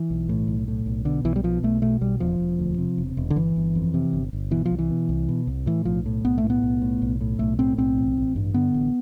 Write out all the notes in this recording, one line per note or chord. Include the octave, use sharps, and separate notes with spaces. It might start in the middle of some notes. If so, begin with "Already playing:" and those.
Already playing: E3
B1
A2
B1
A2
B1
B2 D3
B1 E3
G3
B2 F3
B1 A3
B2 A3
B1 G3
E1 F3
E1
D2
C3
E1
E1
D3
G1 E3
G1
F2
C3
G1
G1
B2 E3
F3
C2
E3
B2
C2
B2
C2
A2 E3
B1 F3
A2
B1 B3
A3
A2
B3
B1
A2
B1
A2
B1 A3
A2 C4
B1 C4
A1
A1
G2
D3 B3
A1